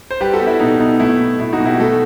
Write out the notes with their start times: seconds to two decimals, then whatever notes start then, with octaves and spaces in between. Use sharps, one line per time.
0.11 C5
0.20 G3 G4 B4
0.33 F#4 A4
0.41 B3
0.47 E4
0.60 B2 D#4
0.80 B3 D#4
1.00 A3 E4
1.20 B2
1.39 B2 E4
1.53 D#4 F#4
1.60 B2
1.66 E4 G4
1.80 A3 F#4 A4